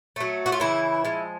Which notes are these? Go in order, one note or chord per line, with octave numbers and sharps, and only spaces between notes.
F#3 A3
F#4
F4
C#3 E3 E4
F3 G#3